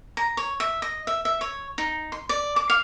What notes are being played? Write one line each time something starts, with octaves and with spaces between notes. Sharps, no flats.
A#5
C#5
E5
D#5
E5
E5
C#5
D#4
C6
D5
D6
F5